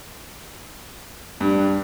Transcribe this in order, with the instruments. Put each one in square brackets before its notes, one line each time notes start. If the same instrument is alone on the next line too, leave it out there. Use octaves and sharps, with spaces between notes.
[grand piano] G2 [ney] D4